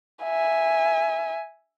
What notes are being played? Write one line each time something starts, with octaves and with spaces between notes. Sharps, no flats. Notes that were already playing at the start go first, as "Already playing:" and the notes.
E5 G#5